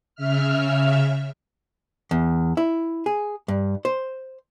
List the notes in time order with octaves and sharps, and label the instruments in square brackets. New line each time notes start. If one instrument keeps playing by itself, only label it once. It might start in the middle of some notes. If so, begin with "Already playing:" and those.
[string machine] C#3 E5 F6
[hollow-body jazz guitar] E2
E4
G#4
G2
C5